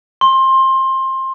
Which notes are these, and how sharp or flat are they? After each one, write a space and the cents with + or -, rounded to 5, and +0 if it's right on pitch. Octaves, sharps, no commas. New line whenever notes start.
C6 +20